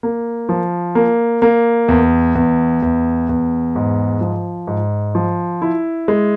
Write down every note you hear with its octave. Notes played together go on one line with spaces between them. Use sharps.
A#3
F3
A#3
A#3
E2
E2
E2
E2
G#2
F3
G#2
F3
E4
G#3